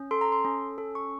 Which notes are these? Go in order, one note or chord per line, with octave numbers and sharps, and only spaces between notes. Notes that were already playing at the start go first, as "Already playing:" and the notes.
Already playing: C#4
A4 C6
A#5
C6
C#4
A4
C#6